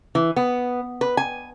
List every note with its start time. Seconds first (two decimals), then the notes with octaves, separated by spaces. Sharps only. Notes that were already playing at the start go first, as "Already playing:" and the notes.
0.15 E3
0.36 B3
1.01 B4
1.17 G#5